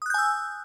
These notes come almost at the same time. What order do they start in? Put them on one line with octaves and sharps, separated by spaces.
D#6 F#6 G6 G#5 E6